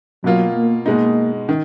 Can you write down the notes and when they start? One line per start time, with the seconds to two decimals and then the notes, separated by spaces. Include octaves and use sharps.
0.24 B2 F#3 A#3 F4
0.55 A#3
0.86 B2 G#3 A#3 D#4
1.49 D#3